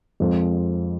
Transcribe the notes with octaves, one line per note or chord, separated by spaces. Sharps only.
F2 F3 G#3